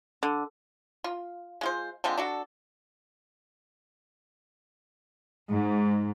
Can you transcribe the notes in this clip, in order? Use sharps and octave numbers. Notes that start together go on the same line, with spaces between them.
D3
F4
G#3 F4 C5
D3 F3 G#3 C4
D4 F#4 A4
G#2